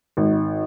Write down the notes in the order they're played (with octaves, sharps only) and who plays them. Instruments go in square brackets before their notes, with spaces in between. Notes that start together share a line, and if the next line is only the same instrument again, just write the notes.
[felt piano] G#1